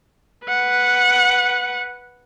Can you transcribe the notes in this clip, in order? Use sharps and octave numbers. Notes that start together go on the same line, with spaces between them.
B4 F#5